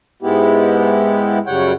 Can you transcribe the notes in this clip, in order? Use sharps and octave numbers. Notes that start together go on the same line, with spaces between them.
G#2 G#3 B3 E4 G4
F#2 C#3 G3 C#5 F#5 G5